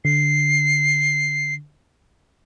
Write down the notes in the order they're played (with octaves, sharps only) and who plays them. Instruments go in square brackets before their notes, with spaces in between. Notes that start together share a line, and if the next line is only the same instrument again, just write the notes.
[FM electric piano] D3 [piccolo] C7